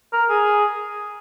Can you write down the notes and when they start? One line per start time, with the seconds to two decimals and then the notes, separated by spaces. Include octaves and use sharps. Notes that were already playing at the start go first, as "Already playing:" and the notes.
0.13 A#4
0.30 G#4